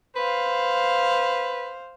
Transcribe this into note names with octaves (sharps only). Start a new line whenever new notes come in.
B4 C5 F5